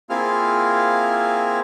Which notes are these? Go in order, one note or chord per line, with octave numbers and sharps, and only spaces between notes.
A#3 C4 E4 F4 G#4 F6